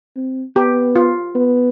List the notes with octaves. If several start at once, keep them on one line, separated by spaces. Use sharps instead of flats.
C4
B3 G4
F4
B3